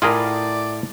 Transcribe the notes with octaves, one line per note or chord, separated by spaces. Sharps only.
A2 F4 G#4 A#4 D5